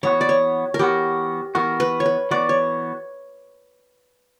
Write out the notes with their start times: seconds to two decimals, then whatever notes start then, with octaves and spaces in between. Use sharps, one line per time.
0.03 E3 B3 F#4 C#5
0.21 D5
0.29 C#5
0.74 A#4
0.79 E3 B3 F#4 G4
1.55 E3 B3 F#4 A#4
1.80 B4
2.00 C#5
2.06 B4
2.31 E3 B3 F#4 D5
2.49 C#5